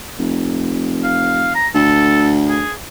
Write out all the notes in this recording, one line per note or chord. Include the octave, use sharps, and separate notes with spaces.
F1
F5
A#5
D2 A4
G#4